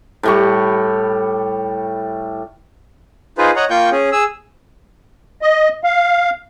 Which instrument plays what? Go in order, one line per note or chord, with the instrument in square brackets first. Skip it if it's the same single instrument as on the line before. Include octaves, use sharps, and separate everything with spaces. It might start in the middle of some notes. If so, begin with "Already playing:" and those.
[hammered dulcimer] A2 G3 C#6
[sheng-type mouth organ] D#4 F4 G#4 B4 C5
C#5 D#5 F#5 A#5
A#3 F4 G5 C#6 G6
C#4 G#4
G#4 E6
[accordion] D#5
F5